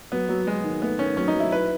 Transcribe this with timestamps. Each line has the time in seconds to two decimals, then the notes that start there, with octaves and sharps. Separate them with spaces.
0.12 F#3 B3
0.29 F#3
0.47 F#3 G#3
0.64 D#3
0.81 A3 B3
0.99 D#3 C#4
1.17 F#3 C#4
1.28 D#4
1.34 F#3
1.40 E4
1.52 E4 B4